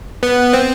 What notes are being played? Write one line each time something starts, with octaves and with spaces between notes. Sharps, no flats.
B3
C4